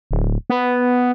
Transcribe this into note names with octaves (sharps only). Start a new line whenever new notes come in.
D1
B3